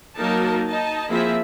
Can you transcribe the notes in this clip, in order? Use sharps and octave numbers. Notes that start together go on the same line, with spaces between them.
F#3 A#3 D#4 A#4 A5
D#4 D#5 A5
F3 A#3 C4 E4 G#4 E5